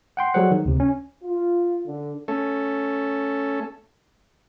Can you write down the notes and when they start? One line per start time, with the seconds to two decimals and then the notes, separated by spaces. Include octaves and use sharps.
0.17 F#5 G5 C6
0.34 F#3 G3 G#4 A4 C5 F#5
0.51 D#3
0.66 D2 C3
0.80 C#4
1.24 F4
1.86 D3
2.28 A3 C#4 A4